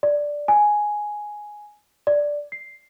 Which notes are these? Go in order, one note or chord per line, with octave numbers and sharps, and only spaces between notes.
D5
G#5
D5
C7